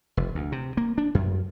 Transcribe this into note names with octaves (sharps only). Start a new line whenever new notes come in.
F1
D2
C3
A#3
D4
F#2